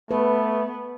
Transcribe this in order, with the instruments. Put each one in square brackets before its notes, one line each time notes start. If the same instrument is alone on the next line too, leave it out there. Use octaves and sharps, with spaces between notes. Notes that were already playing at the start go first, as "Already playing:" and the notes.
[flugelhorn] A3 [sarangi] B3 [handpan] B4